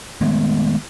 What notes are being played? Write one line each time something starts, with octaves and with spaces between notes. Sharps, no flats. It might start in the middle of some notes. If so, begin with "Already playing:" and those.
D#3 G#3 A3 B3